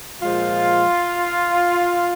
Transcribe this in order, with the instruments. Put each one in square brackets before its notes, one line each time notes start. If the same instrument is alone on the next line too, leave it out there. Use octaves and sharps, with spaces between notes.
[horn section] A#2 F3 G#3 F4